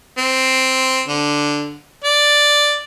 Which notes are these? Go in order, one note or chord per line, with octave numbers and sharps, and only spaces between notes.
C4
D3
D5